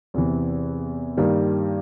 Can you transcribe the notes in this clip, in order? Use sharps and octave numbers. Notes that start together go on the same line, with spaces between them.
E2 C3 E3
G2 D#3 G3 A#3